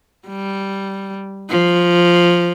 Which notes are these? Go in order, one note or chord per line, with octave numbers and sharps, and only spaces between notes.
G3
F3